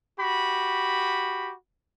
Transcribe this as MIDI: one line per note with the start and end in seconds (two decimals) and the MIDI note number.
0.20 1.54 66
0.20 1.54 67
0.20 1.54 83